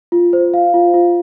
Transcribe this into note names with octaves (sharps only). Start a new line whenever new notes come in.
F4
C5
F5
F4
F4